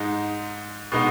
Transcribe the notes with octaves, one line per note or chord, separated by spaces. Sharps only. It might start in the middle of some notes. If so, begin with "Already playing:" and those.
Already playing: G#2 G#3 D#4
B2 G#3 B3 D#4